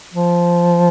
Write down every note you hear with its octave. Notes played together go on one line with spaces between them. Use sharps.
F3